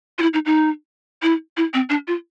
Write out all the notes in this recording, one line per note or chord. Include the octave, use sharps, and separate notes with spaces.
F4
E4
D#4
D#4
E4
E4
C4
D4
F4